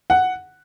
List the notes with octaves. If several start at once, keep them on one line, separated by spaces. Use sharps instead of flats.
F#5